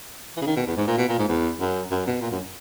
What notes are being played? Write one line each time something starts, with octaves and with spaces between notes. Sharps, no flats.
E3
C#3
D#3
B2
E2
G#2
A#2
B2
A#2
G#2
E2
F#2
F#2
B2
A#2
F#2